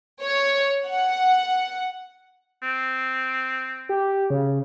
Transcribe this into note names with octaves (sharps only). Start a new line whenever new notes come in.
C#5
F#5
C4
G4
C#3